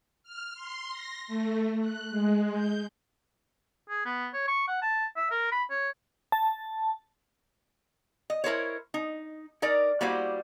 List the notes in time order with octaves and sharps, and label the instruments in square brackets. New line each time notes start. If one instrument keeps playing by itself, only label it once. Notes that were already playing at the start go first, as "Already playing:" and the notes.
[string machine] F6
C6
A#6
A3
F#6
G#3
G6
[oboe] G#4
B3
C#5
C#6
F#5
A5
E5
A#4
B5
C#5
[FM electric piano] A5
[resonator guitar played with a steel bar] D#5
E4 A#4 C5 C#5
D#4
D#4 A#4 D5
G3 A#3 E4 F#4 C5 D5